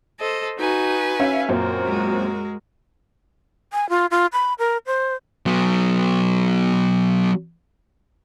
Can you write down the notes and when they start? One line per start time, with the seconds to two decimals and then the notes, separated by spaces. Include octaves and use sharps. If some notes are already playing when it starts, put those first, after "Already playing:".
0.20 A4 C5 D#5
0.59 D#4 F#4 B4 G#5
1.20 C#4 E5 F5
1.49 F#2 A#2 C4 F#4 A#4
1.85 G#3
3.72 G#5
3.90 F4
4.11 F4
4.33 B5
4.59 A#4
4.87 C5
5.46 F#3 B3